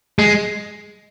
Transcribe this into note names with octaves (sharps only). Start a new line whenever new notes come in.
G#3